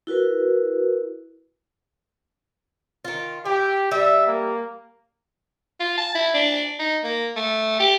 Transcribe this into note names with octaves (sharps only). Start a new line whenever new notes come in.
E4 F#4 A#4 B4
D#3 F4
E4 G4
G3 E5
A#3
F4
A5
E4
D4
D#4
A#3
A3
G4